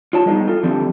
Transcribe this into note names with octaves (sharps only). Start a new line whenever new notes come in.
F4 C#5 A5
G3 G#3 B3 D#4
F4 A4
D3 F3 G3 A3 C4 D4